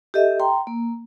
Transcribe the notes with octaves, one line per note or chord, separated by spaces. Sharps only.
G4 A4 D#5 E5
G5 A#5 C6
A#3